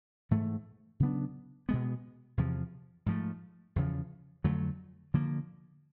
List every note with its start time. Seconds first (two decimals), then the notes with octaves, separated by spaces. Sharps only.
0.31 G#2 E3 A3
1.00 C#3 F#3 B3 D4
1.69 B2 G#3 B3
2.37 E2 C3 F3
3.06 G#2 F3 A3
3.76 E2 C#3 F3
4.44 F2 D3 F#3 A3
5.14 D3 F3 A#3